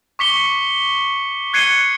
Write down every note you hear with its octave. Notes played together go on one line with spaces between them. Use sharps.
C#6 D6 B6 C#7 G7
F#6 G#6 C7 C#7 D#7 G7